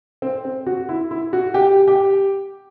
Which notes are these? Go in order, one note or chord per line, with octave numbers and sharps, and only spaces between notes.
C4
C4
F#4
E4
E4
F#4
G4
G4